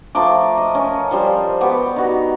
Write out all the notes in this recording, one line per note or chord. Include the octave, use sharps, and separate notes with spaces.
F3 A3 A#5 D6
D#5
C#4 A#4
F3 G3 C5
B3 G4 C#6
D#4 F#4